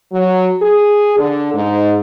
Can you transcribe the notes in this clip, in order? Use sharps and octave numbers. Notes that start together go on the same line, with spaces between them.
F#3
G#4
D3
G#2